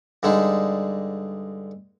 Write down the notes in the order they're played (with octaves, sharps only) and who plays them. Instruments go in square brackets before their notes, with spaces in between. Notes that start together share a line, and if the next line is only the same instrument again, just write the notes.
[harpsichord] G2 D3 G#3 D#4